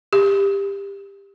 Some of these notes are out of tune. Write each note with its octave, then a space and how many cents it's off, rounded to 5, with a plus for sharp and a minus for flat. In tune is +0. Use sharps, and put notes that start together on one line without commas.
G4 +20